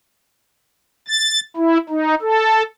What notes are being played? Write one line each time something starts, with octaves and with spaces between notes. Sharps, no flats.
A6
E4
D#4
A4